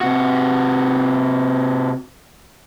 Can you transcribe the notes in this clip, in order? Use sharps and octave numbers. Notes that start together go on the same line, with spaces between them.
C3 F#4